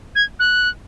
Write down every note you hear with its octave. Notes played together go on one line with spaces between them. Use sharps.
G#6
F#6